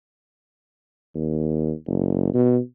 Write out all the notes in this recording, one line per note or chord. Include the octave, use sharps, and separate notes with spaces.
D#2
F#1
B2